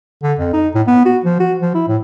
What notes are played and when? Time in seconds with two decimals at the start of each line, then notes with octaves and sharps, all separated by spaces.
0.23 D3
0.39 F2
0.53 D#4
0.74 A2
0.87 B3
1.05 F#4
1.25 F3
1.40 F#4
1.61 F3
1.75 E4
1.88 A2